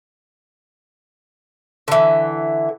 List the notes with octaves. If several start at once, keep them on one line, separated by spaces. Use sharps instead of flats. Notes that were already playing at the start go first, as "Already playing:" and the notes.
D3 E3